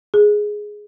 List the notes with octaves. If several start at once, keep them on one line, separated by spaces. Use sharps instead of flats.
G#4